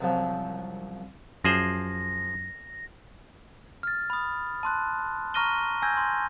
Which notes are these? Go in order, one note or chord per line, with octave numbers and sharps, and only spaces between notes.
C2 F#2 F3
F#2 F3 G#4 C5 A#6
F6 A6
B5 D#6
A5 C6 F#6
A#5 C#6 F6 A#6 D#7 G7
G#5 E6 G6 G#6 A#6
C6